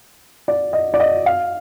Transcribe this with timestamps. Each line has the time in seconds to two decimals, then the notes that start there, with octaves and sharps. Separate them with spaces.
0.48 D5
0.73 D#5
0.94 D5
1.00 D#5
1.26 F5